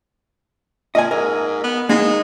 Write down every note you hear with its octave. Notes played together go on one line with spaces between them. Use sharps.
A#2 D#5 G#5
G#2 A#4
B3
G#3 A#3 D#4